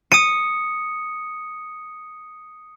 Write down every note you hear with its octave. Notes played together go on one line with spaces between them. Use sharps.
D#6 C#7 D#7